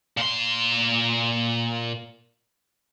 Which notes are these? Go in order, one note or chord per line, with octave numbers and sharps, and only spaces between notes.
A#2 C6